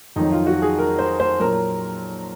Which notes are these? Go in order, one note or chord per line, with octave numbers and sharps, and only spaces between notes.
F2 D#3 F#3 D#4
F4
F#4
G#4
A#4
C5
C5
A#2 F#3 A#4